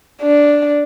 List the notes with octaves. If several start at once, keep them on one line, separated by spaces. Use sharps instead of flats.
D4